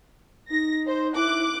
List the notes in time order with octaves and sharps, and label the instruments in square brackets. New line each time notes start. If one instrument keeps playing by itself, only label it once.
[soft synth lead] D#4 [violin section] A#6
[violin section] C5
[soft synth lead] E4 [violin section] D6 F#6